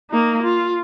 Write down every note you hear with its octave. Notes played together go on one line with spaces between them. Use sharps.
A#3 D#4
F4